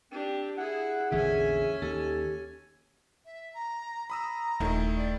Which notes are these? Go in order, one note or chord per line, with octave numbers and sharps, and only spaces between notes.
C4 D4 G4
E4 G#4 F#5
A#1 E2 D3 C#4 G#4 E5 G#5
D#2 G4 A4
E5
A#5
A#5 B5 D#6 E6
D#1 D#3 A3 E4
D5